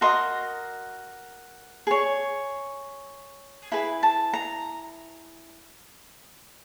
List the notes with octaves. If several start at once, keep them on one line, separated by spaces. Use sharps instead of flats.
F#4 A#4 D#5 C6
G#4 C#5
E4 G#4 B4 B5
A5
A#5